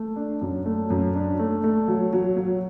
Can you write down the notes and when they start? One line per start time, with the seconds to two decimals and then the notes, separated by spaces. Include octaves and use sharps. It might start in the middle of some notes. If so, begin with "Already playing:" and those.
Already playing: A3
0.16 D4
0.41 F#2
0.66 A3
0.90 F#2
1.15 D4
1.39 A3
1.64 A3
1.88 F#3
2.13 F#3
2.37 F#3